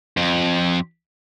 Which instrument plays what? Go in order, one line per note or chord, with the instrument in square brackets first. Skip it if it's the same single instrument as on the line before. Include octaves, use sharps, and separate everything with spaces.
[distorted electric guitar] F2